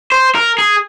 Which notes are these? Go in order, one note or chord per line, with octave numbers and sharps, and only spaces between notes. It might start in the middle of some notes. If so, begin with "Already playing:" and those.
C5
A#4
G#4